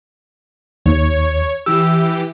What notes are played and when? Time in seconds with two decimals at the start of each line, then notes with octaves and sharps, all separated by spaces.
0.86 D#2 C#5
1.66 E3 G4 E6